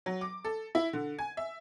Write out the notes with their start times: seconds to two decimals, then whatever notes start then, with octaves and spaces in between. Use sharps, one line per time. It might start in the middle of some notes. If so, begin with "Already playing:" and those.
0.06 F#3
0.21 D6
0.45 A4
0.75 E4
0.93 D3
1.19 G#5
1.37 E5